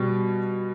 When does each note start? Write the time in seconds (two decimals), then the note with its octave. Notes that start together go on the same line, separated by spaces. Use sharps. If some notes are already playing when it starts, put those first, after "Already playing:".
Already playing: B2 G3